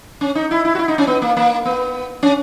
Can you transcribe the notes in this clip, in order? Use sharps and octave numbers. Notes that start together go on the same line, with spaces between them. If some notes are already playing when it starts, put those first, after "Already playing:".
C#4
D#4
E4
E4
F#4
E4
D#4
C#4
B3
A#3
A#3
B3
C#4